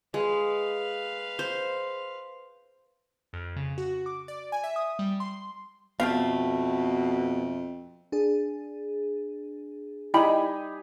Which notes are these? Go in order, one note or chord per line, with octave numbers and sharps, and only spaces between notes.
G#3 B4 F5
C5
F2
C#3
F#4
D6
D5
G#5
E5
D#6
G3
C6
F2 B2 A3 B3 G4 F5
D4 G#4
G3 D#4 E4 G5 G#5 B5